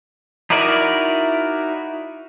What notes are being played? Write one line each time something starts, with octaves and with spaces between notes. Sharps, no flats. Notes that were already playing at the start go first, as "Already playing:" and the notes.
D#4 E4 F#4 A#4 D5